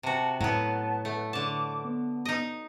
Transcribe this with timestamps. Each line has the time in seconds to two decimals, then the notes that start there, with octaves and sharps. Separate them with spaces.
0.03 C3 F#4 A5
0.41 A2 F#3 B3
1.05 A3
1.33 D3 A5 D6
1.84 B3
2.25 D#4 D#5